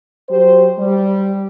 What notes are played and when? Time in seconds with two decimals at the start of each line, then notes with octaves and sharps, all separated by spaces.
0.30 F#3 G4 C5
0.79 G3